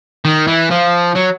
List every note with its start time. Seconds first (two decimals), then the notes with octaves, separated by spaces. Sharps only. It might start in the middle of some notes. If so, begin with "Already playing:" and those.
0.25 D#3
0.48 E3
0.71 F3
1.16 F#3